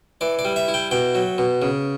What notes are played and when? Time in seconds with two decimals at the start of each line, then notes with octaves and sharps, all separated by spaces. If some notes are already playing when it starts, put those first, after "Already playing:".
0.21 E3 D5
0.39 D5
0.45 G3
0.56 E5
0.68 E4
0.74 G5
0.91 B2 G5
1.15 F#3
1.38 B2
1.62 C#3